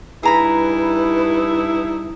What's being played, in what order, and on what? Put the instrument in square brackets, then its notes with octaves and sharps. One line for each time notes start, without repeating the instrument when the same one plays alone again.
[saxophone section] G2 D#4 E4 [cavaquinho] G#4 A#5 B5 [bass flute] B4